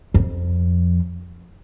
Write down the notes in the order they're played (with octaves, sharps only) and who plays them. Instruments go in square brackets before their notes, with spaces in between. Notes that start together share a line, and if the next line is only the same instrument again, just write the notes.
[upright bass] F2